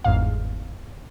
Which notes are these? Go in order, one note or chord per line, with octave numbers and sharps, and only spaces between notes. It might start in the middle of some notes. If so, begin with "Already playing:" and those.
G1 E2 G#2 F5